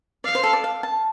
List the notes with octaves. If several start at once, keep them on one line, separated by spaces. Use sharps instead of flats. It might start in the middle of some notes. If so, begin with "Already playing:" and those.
D5 F5
C5
A4
D5
F5
A5